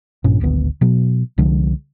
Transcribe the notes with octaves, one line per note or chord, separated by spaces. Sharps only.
A#1 G2 A#2 C#4
D1 G#1 D2 B3
B2 F#3
C2 D3 F3 G#3